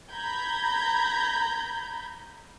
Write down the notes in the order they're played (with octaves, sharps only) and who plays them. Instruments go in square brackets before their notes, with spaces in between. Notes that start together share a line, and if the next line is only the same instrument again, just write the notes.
[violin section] A#5 B5 G6 G#6